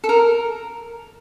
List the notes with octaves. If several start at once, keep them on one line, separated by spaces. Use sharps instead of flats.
A4
A#4